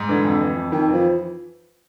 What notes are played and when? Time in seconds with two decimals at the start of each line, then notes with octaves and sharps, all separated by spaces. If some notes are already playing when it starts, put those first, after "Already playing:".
Already playing: G#2
0.09 D3 E3
0.25 F2
0.41 E3
0.57 F2
0.72 F2 D#3
0.88 E3 F3